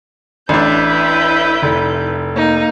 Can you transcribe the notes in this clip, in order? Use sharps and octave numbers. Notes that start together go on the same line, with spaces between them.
A1 D4 E4 B4 G6
F1
A#3 D#4